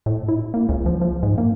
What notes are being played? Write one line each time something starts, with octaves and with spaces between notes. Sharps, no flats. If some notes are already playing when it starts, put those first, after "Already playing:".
A2
E4
A#3
C#2
F3
F3
G#2
A#3